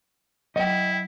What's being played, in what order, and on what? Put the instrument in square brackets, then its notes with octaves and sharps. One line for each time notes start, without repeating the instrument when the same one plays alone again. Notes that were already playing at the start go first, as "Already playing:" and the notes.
[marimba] F#3 [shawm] E4 [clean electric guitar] D#5 G5